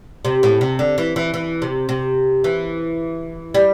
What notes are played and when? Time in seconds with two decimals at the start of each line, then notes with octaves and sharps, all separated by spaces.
0.25 C3
0.43 A2
0.61 C3
0.79 D3
0.98 E3
1.16 E3
1.34 E3
1.62 C3
1.89 C3
2.44 E3
3.54 G3